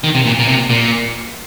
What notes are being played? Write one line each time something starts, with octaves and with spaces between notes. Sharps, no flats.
D#3
C3
A#2
A#2
C3
A#2